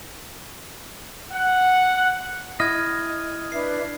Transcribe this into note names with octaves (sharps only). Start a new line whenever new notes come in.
F#5
E4 D#5 F6 G#6
D4 B4 E5 C7